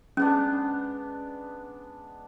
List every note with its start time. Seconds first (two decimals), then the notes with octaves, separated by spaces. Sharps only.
0.17 G#3 B3 C#4 D4